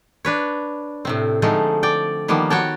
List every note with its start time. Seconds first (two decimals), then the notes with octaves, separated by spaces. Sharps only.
0.25 D4 B4 C#5
1.05 A2 C3 C4
1.42 D3 F3 G#3 A3 D#4
1.83 D5 G5
2.28 D#3 F3 G3 A#3 B3
2.50 F#4 C#5 G5 A5